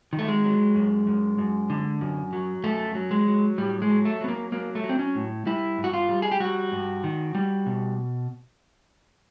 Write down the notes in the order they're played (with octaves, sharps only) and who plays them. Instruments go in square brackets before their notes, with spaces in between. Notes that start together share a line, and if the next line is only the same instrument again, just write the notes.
[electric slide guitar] D#3
A3
G#3
F#3
F#2
F#2
F#2
D3
F#2
F#3
F#2 A3
F#3
G#3
F#3
A2 G3
G#3
F#3
A3
F#3 B3
A#3
F#3 A#3
A3
F#3
C4
C#4
A2
G3 E4
G2
F#4
F4
G3
G#4
G4
G3 F#4
G2
D#3
G3
B2